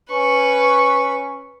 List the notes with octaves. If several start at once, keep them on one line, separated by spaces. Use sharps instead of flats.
C#4 B4 C#6